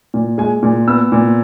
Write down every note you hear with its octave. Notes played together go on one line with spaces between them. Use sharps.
A#2
G#3 G#5
A#2
B3 E6
A#2